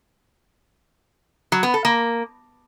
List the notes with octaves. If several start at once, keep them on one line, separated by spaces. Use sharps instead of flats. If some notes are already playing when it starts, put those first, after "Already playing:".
F#3
B3
A4
A#3